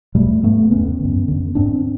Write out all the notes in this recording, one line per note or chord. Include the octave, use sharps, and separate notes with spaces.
E2 B2 G3 A3
G#2 A3 B3
E2 C#3 B3 C#4
F#2 D3
F2 D3
G#2 C4 D4